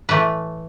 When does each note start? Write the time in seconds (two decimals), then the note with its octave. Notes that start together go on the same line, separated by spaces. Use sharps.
0.09 A2 E3 A3 B4